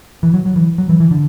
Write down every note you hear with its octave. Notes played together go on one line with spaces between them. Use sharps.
E3
F#3
F#3
E3
F#3
E3
E3
D3